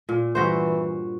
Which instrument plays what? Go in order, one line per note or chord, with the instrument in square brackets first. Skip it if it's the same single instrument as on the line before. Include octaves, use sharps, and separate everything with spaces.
[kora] A#2
[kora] G2 F#4 C5 [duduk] E3